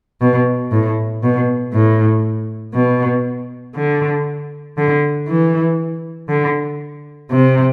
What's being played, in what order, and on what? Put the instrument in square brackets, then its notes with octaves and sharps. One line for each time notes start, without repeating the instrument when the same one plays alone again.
[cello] B2
A2
B2
A2
B2
D3
D3
E3
D3
C3